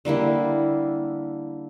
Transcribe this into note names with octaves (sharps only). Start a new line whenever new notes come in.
D3 G3 A#3 E4